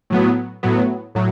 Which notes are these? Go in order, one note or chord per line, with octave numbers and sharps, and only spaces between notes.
A2 F#3 B3
A2 F#3 B3
A2 F#3